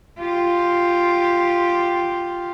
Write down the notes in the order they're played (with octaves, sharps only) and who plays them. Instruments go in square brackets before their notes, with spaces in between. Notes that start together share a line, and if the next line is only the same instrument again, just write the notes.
[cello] F4 G4